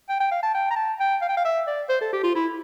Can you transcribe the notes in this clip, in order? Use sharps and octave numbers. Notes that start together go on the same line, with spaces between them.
G5
G5
F5
A5
G5
A#5
A5
G5
F5
G5
F5
E5
D5
C5
A4
G4
F4
E4